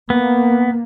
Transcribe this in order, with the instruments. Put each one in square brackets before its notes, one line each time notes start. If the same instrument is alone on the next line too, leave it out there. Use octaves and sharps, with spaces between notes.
[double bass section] A#3 [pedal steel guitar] B3